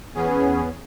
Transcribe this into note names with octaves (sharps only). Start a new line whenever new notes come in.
E2 B3 C#4 G#4